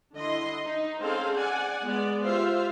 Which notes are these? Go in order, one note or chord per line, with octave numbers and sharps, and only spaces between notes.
D3 E4 D#5 C6
D#4
C4 C#4 G#4 A4 C5 F5
D5 F#5 G#5
G#3 B3 D5
F4 G4 C5 E5 F5